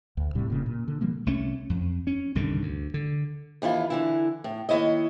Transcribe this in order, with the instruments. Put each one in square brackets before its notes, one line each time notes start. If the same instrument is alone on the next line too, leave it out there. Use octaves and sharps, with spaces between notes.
[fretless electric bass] D2
D#1 A2 C3 G3
F1 A#2 C#3
A#2
D3
B2 F3 G3 A#3
[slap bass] C2 A3 C#4
F2
C#4
C2 G2 D3 D#3
D2
D3
[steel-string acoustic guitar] D#2 E3 E4 F4
D3 E3 E4
A2
D#2 E3 E4 C#5 D#5